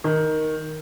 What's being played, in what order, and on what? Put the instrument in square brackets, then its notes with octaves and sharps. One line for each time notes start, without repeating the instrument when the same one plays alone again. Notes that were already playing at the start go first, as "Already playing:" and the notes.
[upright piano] D#3